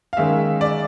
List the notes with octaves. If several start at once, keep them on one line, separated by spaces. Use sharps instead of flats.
F5
D#3 G#3 C#4 E5
D5